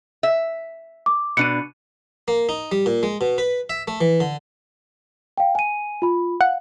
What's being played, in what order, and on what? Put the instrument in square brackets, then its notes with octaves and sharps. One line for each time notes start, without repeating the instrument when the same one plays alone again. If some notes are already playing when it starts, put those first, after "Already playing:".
[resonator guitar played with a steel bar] E5
[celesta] D6
[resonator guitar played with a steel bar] B2 D4 [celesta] C#7 D#7
[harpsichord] A#3
D#4
G3
A#2
G#3
B2
B4
E5
A3
E3
D3
[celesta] F5 G5
G#5 D#7
F4 B5
[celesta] F5 [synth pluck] F#5